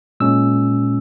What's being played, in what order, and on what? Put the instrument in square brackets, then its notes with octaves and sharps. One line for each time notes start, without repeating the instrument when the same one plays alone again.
[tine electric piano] A#2 G#3 C#4 E6